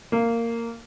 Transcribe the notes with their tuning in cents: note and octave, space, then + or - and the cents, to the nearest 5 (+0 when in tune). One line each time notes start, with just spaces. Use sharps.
A#3 -15